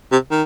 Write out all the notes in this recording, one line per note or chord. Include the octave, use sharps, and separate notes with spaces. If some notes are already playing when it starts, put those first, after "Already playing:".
C3
D#3